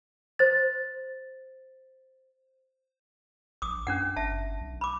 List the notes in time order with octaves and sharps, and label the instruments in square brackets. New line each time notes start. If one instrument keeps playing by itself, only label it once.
[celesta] C5 A6
[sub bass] A#1 [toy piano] D6 D#6
[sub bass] F#2 [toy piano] C#4 D4 F#5
[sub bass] G1 [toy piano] E5 A5
[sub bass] B1
[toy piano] B5 D6